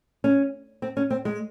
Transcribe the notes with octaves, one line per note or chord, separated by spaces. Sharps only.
C#4
C4
C#4
C4
G#3